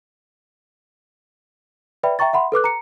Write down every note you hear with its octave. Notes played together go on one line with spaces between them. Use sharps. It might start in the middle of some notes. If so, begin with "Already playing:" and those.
B4 D5 E5 G5 B5
E5 G5 A#5 C#6 A6
E5 F#5 B5 C6
A4 B4 D6 F#6
A#5 C#7